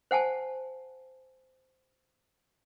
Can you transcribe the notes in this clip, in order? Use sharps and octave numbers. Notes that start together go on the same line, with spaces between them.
C5 F#5 G#5 A5